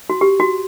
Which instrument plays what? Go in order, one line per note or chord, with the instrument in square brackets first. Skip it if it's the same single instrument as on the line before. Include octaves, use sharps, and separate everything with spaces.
[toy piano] F#4
G4
F#4